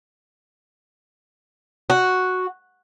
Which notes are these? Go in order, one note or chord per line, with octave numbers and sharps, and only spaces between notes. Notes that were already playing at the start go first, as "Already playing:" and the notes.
F#4